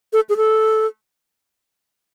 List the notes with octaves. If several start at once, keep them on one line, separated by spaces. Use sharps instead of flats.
A4
G#4
A4